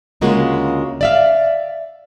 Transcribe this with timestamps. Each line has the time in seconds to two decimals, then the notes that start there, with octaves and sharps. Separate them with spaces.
0.21 D2 C#3 G#3 A#3 F4 F#4
1.01 D5 E5 F5